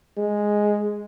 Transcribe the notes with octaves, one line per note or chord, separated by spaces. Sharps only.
G#3